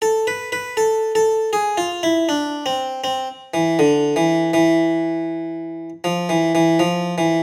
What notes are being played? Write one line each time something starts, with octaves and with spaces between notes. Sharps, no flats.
A4
B4
B4
A4
A4
G#4
F4
E4
D4
C4
C4
E3
D3
E3
E3
F3
E3
E3
F3
E3